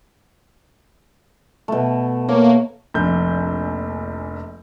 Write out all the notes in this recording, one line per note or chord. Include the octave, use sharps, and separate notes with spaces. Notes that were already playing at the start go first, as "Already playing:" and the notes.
B2 A3
A#3 C#5
F1 A#1 G6